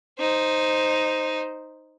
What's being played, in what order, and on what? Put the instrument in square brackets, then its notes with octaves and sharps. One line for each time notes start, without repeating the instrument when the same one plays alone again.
[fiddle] D#4 C5